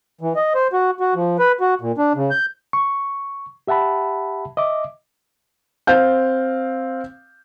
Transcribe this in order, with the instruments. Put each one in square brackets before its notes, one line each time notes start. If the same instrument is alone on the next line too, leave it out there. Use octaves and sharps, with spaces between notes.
[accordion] E3
D#5
C5
F#4
F#4
F3
B4
F#4
A#2
D4
C#3
G6
[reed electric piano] C#6
G4 E5 F#5 A5 B5
D#5 E5 D6
[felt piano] C4 F5 G6